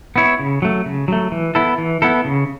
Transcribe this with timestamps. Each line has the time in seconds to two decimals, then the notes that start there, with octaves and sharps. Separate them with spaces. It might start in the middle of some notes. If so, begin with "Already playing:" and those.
0.16 B3 E4 C#5
0.39 C#3
0.62 F#3 A3
0.86 C#3
1.08 F#3 A3
1.32 E3
1.55 B3 E4 A4
1.78 E3
2.02 B3 E4 A4
2.25 C#3